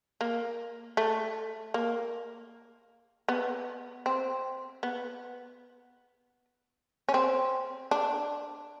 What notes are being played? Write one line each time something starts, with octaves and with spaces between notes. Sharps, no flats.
A#3
A3
A#3
B3
C4
B3
C#4
C4
D4